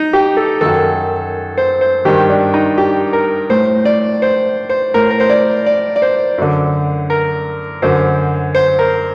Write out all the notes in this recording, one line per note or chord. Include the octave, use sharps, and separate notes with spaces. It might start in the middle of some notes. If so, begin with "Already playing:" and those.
Already playing: D#4
G4
A4
F#2 D#3 A4
C5
C5
G2 D#3 G4
D4
D#4
G4
A#4
A2 C5
D5
C5
C5
A2 A#4
A#4
C5
D5
D5
D5
C5
F#2 D3
A#4
F#2 D3 C5
C5
A#4